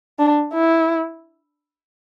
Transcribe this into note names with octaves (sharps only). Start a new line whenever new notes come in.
D4
E4